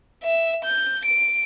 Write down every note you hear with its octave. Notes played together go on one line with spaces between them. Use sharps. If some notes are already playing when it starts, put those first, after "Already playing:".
E5
G6
D7